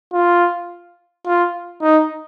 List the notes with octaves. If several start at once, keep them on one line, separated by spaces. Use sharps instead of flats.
F4
F4
D#4